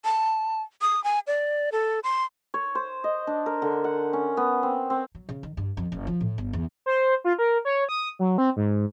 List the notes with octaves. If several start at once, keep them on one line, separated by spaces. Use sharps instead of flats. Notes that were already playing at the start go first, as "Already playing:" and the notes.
A5
D#6
G#5
D5
A4
C6
C#5
C5
D#5
D4
A#4
D3
F#5
C#4
B3
C4
C4
F#3
C#3
D#3
G2
F2
F#1
F3
A2
G1
E2
C5
F4
A#4
C#5
D#6
F#3
C4
G#2